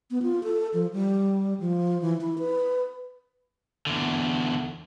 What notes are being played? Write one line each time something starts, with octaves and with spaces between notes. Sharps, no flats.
B3
F4
A4
F3
G3
F3
E3
E4
B4
E2 D3